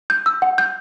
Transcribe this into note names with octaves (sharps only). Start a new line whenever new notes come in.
G6
E6
F#5
G6